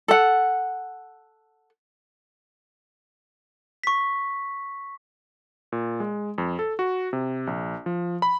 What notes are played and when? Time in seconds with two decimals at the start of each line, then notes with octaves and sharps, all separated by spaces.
0.08 A4 F#5
3.84 C#6 B6
5.72 A#2
6.00 G#3
6.38 F2
6.59 A4
6.79 F#4
7.13 C3
7.47 A#1
7.86 F3
8.22 B5